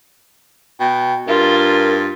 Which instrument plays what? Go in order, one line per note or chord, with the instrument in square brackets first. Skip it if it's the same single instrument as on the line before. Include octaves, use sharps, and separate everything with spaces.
[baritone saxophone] B2 [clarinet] G5
[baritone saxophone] G2 [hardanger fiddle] F4 [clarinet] A#4